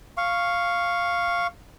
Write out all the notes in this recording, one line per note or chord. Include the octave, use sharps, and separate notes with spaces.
F5 C#6